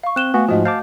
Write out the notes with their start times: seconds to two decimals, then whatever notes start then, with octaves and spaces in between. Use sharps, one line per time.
0.03 F5 C#6
0.16 C4 F#6 E7 G7
0.34 A3 B3 F#4 F5 G#5
0.49 G#2 F3 F#4 D#5 F#5
0.65 C5 F5 A5 D6 G6